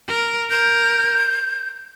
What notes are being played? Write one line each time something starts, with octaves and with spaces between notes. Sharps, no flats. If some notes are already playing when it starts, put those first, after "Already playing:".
A#4
A#4 G6